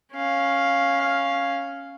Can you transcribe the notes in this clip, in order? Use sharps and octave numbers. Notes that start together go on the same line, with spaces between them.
C#4 F5